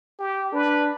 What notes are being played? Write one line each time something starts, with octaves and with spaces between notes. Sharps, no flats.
G4
D4 B4